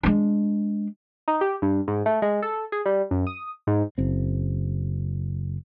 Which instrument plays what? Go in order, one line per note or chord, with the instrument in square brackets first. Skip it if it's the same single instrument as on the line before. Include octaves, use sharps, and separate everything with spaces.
[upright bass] G#3 D4
[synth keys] D#4
G4
G2
G#2
A3
G#3
A4
G#4
G3
F#2
D#6
G#2
[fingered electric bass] F#1 C4